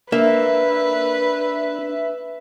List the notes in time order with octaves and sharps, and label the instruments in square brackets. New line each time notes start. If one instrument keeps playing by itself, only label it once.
[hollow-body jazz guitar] A#3 [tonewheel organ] D4 [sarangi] B4 [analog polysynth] E5